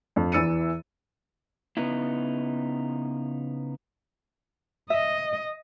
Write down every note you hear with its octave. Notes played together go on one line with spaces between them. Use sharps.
F2
E2 E3 E6 A6 C#7 D#7
C#3 B3 D#4 E4
D#5 E5